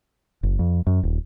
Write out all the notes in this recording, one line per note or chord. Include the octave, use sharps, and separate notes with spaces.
F#1
F2
F#2
D#1